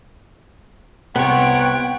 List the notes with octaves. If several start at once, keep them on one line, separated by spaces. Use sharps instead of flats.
C2 G#2 C3 B3 C#5 F#5 G5